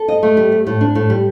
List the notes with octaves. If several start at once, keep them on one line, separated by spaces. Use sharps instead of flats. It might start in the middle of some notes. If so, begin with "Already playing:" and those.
Already playing: A4
D#5
A3
G3
G3
A2
D4
A2
G3